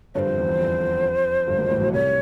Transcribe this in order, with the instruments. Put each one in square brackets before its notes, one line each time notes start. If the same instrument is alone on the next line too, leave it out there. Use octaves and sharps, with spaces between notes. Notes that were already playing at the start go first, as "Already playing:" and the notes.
[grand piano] G1 G2 [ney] C5 C#5
[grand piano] F2
E2
E2
F2
G1 G2
G#1 G#2
A1 A2
B1 B2
[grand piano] C2 C3 [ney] C#5